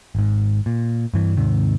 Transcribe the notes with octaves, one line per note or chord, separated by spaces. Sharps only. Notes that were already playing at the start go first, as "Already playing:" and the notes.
G#1 G#2
A#2
G2 E3
D#2 G#2 C3 D#3